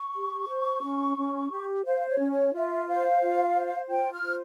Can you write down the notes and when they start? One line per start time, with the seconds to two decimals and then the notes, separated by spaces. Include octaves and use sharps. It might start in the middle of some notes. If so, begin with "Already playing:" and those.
Already playing: C#6
0.16 G4
0.49 C5
0.83 C#4
1.18 C#4
1.51 G4
1.85 C5 F5
2.08 C#5
2.20 C#4
2.31 C#5
2.54 F4 E5
2.88 C5 F5
3.22 F4
3.56 C5
3.89 F4 G5
4.13 F6
4.24 C5